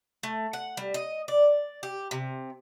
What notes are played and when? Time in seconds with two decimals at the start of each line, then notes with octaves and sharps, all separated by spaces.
0.23 A3
0.53 F#5
0.77 G3
0.94 D#5
1.28 D5
1.83 G4
2.11 C3